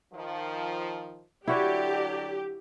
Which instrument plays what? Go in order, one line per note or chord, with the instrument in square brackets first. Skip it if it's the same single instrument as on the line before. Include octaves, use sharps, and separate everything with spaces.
[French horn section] D#3 F3
[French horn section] D3 F#3 [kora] E4 F#4 C#5 [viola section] G4 [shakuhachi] D5